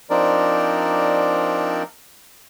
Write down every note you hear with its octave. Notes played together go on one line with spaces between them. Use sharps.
F3 C4 D4 D#4 A#4 D5